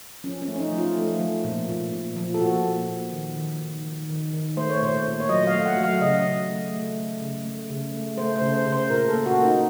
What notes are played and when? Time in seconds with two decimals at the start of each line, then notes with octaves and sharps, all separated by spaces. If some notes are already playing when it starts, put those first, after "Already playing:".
0.24 F3 C#4
0.42 C#4
0.48 A3
0.56 C#4
0.59 D#4
0.72 F3
0.78 F4
0.96 A3
1.20 F3
1.44 A#2
1.68 A#2
1.92 A#2
2.16 F3
2.34 A4
2.40 A#2 F#4
2.64 A#2
2.89 A#2
3.12 D#3
3.36 D#3
3.60 D#3
3.85 D#3
4.09 D#3
4.33 D#3
4.57 A3 C5
4.70 C#5
4.81 A#2 C5
5.05 A#2
5.20 C#5
5.29 F#3 D#5
5.47 F5
5.54 A3
5.66 F#5
5.77 F#3
5.83 F5
6.01 C#3 D#5
6.25 C#3
6.50 A3
6.74 A3
6.98 A3
7.21 C#3
7.45 A3
7.70 C#3
7.94 A3
8.17 A3 C5
8.36 C5
8.42 C#3
8.54 C5
8.66 C#3
8.72 C5
8.90 A#2 A#4
9.08 A4
9.14 A#3
9.26 F#4
9.38 A#3
9.45 D#4